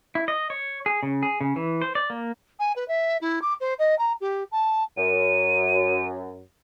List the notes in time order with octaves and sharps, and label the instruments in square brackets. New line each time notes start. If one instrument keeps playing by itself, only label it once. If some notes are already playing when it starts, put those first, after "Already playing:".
[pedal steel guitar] E4
D#5
C#5
G#4
C#3
G#4
C#3
E3
C5
D5
A#3
[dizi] G#5
B4
E5
E4
D6
C5
D#5
A#5
G4
A5
[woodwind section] F#2 [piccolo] D#7